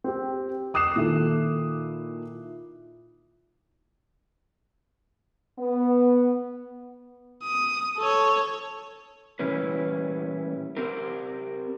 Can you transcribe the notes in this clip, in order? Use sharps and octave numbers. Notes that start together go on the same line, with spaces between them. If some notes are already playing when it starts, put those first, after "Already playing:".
C4 G4
D6 D#6 F#6 C7 E7
A#2 D#3 E4 A4
B3
D#6
A4 C#5
A#2 E3 G3 C#4 E4 B4
C4 G4 A#4